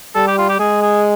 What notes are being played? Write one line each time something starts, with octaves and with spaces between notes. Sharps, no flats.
G3 A4
G4
F4
G4
G#3 G#4
G#4